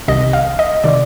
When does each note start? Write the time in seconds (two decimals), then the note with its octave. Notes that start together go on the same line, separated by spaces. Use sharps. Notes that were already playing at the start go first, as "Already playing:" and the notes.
0.08 C2 C3 D#3 D#5
0.33 F5
0.59 D#5
0.84 C3 D#3 D5